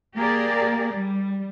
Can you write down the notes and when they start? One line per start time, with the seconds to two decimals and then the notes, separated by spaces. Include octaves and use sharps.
0.15 A#3 G4 G#4 A#4 D5
0.92 G3